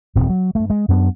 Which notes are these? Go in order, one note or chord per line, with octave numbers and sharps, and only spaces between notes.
D#1 D2 A#2 C4
F#3
G2 A3
G#3
F#2 F#3 B3 D4